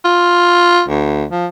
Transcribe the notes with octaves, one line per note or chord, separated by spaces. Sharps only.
F4
D2
F3